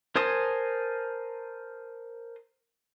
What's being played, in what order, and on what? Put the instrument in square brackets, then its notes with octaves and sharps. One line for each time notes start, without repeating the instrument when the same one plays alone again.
[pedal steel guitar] A#4 C5 G#5 A5 D#6